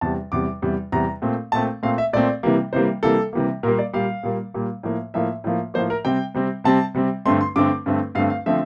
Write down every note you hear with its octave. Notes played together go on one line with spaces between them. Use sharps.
E2 C3 G3 A5
E2 C3 G3 D6
E2 C3 G3
E2 C3 G3 A#5
A#2 A3 C4
A#2 A3 C4 A5
A#2 A3 C4 F5
E5
A#2 A3 C4 D5
C3 E3 G3 A#3
C3 E3 G3 A#3 C5
C3 E3 G3 A#3 A4
C3 E3 G3 A#3
A#2 G3 A#3 A#4
D5
A#2 G3 A#3 F5
A#2 G3 A#3
A#2 G3 A#3
A2 F3 A#3
A2 F3 A#3 E5
A2 F3 A#3
A2 F3 A#3 C5
A#4
C3 G3 C4 G5
C3 G3 C4
C3 G3 C4 A5
C3 G3 C4
G2 D3 A3 C4 C6
C6
G2 D3 A3 C4 D6
G2 D3 A3 C4
G2 D3 A3 C4 F5
F5
D3 F3 A3 C4 E5